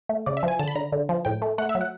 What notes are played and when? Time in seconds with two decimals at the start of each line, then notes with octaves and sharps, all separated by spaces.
0.09 A3
0.26 C#3 D5
0.37 E5
0.43 F3
0.48 G#5
0.59 D3 A5
0.68 B5
0.75 D3 A#5
0.92 D3
1.09 F3
1.25 A2 G5
1.42 A3
1.58 A3 F#5
1.69 E5
1.75 F#3
1.81 F#5